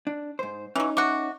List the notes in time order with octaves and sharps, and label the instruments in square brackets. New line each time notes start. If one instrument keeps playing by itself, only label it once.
[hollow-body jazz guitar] D4
G#2 C5
[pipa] E3 F#3 [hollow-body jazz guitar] C#4 D#4
[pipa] F#3 A3 F#4 [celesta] D6